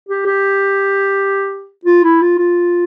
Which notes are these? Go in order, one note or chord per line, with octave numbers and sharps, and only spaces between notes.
G4
G4
F4
E4
F4
F4